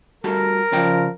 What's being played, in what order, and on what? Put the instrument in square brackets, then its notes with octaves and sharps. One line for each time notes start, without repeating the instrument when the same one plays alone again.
[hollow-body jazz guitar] G3 F#4 A4 [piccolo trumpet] A#4
[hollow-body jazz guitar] C#3 D5 G5 [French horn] F3